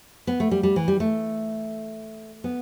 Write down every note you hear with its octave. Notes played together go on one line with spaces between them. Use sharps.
B3
A3
G3
G3
E3
G3
A3
B3